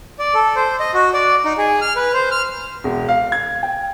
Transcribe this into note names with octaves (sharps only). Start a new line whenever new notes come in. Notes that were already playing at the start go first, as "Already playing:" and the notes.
D5
A4
C5
D#5
F#4
D5
D#4
G#4
F6
B4
C5
F6
E1
F5
G#6
G5